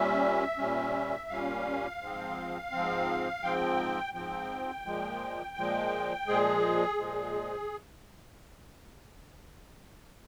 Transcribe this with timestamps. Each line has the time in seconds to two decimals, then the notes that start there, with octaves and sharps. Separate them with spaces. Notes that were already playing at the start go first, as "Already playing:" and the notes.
Already playing: A#2 G3 C#4 E5
0.58 A#2 G3 C#4
1.29 A#2 G3 C#4 F5
2.01 G#2 F3 C4
2.71 G#2 F3 C4
3.42 G#2 F3 C4 G5
4.14 G#2 F3 C4 G5
4.85 A#2 F3 G#3
5.57 A#2 F3 G#3
6.27 A#2 F3 G#3 G#4
6.98 A#2 F3 G#3